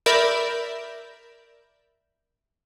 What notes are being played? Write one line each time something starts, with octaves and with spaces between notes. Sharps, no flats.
A#4 D5 E5 B5 G6